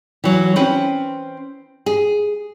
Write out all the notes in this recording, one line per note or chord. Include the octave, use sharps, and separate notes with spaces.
E3 F#3
C4 C#4 B4
G#4